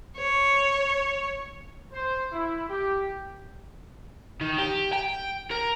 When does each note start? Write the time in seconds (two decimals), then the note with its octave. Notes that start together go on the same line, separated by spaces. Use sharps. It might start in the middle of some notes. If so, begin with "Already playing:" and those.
0.18 C#5
1.93 C5
2.33 E4
2.69 G4
4.41 D#3
4.58 G4
4.93 G5
5.51 A#4